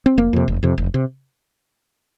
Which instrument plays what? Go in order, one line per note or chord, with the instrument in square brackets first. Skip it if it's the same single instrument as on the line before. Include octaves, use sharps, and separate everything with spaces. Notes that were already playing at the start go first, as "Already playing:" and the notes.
[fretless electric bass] C4
F1 A#3
F2 C3
F1
F2 C3
F1
C3